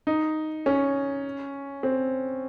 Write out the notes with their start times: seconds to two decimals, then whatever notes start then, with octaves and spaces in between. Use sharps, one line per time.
0.07 D#4
0.66 C#4
1.83 C4